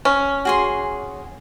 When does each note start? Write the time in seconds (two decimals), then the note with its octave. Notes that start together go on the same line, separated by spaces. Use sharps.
0.05 C#4
0.45 F#4 G#4 C6